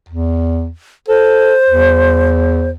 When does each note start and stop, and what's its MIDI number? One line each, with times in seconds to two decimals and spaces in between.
0.09 0.70 40
1.08 1.55 69
1.08 2.70 72
1.70 2.76 40